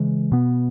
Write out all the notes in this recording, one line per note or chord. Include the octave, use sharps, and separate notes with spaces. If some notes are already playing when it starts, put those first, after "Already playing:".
Already playing: C#3 E3 G#3
B2 B3